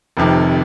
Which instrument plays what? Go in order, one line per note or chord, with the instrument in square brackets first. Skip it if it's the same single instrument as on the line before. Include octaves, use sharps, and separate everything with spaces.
[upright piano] F1 F2 C3 D#3